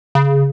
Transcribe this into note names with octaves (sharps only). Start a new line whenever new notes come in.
C#3